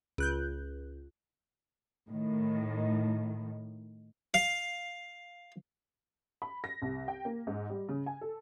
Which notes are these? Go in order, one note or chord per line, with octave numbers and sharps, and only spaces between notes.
C#2 F#6 G6
A2 D#3
F5
B5
A#6
C2
G5
A#3
G#2
G3
C#3
G#5
A4